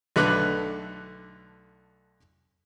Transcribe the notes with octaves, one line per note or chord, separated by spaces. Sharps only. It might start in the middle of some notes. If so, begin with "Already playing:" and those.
B1 D3 A3 B4 D6 F#6